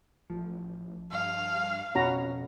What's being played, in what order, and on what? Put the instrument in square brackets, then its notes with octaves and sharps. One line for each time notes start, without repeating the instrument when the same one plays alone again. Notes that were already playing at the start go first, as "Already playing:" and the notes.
[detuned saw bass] A1 [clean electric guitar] F3
[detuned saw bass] G2 [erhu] F5
[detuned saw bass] F2 [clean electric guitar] B2 B5 [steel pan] C#4 F#4 A#5